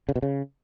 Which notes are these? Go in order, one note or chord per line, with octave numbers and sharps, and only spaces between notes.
C#3
B2
C#3